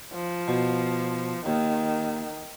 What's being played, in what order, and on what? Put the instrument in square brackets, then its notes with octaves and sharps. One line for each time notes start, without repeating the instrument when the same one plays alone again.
[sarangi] F3
[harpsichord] B2
[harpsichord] D#2 [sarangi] D#3